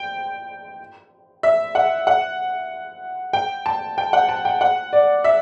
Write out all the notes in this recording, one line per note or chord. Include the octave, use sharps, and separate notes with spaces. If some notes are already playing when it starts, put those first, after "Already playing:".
Already playing: G5
E5
F#5
F#5
G5
A5
G5
F#5
A5
G5
F#5
D5
E5